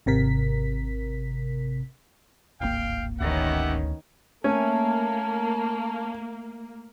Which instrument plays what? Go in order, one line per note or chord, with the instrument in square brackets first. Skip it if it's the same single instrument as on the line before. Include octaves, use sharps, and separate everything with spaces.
[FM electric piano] G#1 C3 A#4 B6
[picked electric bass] D1 G#1 A#3 [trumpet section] F5 G5
[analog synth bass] D2 [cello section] D#3 B3 C#4 [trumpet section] G4 E5 F#5
[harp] A3 G#5 [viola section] A#3 [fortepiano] C#4 [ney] A5